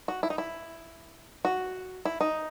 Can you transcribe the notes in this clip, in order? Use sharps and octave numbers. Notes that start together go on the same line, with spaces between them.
F#4
E4
D#4
E4
F#4
E4
D#4